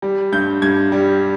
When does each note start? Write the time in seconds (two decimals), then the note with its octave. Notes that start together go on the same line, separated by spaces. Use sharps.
0.02 G3
0.32 G2 G6
0.62 G2 G#6
0.92 G3